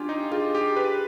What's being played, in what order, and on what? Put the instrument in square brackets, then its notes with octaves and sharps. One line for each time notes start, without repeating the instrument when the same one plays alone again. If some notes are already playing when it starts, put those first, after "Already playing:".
Already playing: [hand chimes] D4 G#5 [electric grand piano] F4 G4
[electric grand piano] D#4
[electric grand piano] F4 [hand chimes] G#4
[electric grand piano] G4
[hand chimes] G#4 [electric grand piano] B4